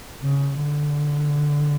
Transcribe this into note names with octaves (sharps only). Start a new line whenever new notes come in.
C#3
D3